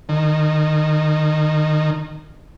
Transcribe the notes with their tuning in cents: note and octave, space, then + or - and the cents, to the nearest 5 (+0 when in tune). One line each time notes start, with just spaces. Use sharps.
D#3 -20